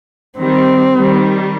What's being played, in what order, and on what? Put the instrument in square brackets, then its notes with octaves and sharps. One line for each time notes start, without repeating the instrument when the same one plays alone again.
[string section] D#3 G3 [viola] C4
[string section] D#3 G3